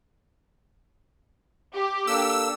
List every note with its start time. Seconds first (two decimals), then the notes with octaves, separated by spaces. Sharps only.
1.74 G4
2.07 A#3 D4 A4 E6